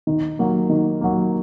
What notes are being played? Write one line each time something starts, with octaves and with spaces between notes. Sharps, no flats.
D#3
F#3 A#3
D#3
F#3 A#3